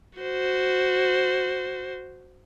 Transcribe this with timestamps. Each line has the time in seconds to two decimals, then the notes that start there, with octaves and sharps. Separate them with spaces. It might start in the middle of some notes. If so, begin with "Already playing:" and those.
0.19 F#4 C5